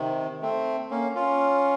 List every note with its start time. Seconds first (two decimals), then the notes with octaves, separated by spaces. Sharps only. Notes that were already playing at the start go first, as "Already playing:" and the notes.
Already playing: C3 D#3
0.42 A3 C4
0.91 A#3 C#4
1.15 C#4 F4